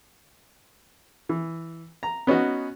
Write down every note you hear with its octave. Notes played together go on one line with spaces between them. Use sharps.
E3
A#5
B3 C#4 D#4 F#4